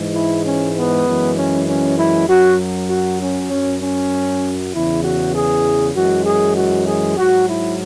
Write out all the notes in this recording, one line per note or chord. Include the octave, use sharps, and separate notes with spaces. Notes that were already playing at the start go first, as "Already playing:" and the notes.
Already playing: G#2 E3 G#3
E4
C#4
B3
F#2 E3 G#3
C#4
C#4
E4
F#2 F#3 F#4
F#4
C#4
F#2 F#3 C#4
C#4
E2 C#3 E3 E4
F#4
G#4
F#2 E3 G#3 F#4
G#4
F#4
G#4
G#2 F#3 F#4
E4